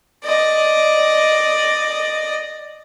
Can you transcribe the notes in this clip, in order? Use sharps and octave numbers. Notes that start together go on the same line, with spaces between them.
D5 D#5